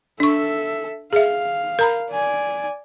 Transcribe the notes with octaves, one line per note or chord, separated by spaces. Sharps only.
D4 A4 E5 C#6
G#4 E5 F5
A#4 A#5 B5
D5 G#5